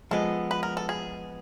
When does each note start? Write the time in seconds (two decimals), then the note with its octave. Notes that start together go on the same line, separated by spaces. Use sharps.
0.11 F3 G#3 B3 A4
0.51 B4
0.63 A#4
0.77 A4
0.89 G#4